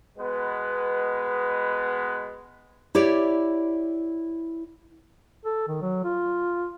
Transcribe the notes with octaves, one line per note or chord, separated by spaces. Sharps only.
B2 G#3 B3 B4
E4 G4 C#5 D5
A4
D#3
F#3
F4